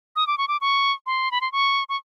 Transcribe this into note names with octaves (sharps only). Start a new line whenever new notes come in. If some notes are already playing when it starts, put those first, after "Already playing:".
D#6
D6
C#6
D6
C#6
C6
B5
C6
C#6
C#6